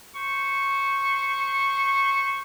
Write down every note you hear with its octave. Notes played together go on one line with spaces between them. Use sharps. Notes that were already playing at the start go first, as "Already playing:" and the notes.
C5 C#6